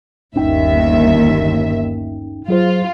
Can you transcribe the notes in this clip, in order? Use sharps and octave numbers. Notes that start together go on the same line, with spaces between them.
G1 D#2 C#4 D#4 E5 G5
F#3 F4 G#4 C5